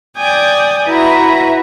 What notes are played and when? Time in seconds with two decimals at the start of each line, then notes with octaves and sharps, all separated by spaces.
0.16 D5 G5 G#5 D#6
0.87 E4 F#4 B4 E5 A#5